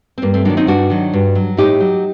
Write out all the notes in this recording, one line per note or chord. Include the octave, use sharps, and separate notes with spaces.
C4
G2 A#3
A3 C4
D#3 F#3 A#3 D4
C4 D#4
G2 D4 F#4
D#3 F#3
G2
F#3
A2 D#4 G4
F#3